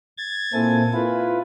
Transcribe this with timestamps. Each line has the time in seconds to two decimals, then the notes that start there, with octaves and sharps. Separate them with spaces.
0.18 G#6 A6
0.54 A#2 A#3 C4 E4 A4 G#5
0.93 E4 F4 B4